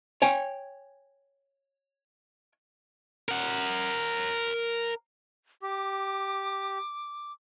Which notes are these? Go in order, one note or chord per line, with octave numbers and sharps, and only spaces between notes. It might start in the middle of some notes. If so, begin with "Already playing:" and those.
C#5 G5 G#5
A#4 F#5
G4 D6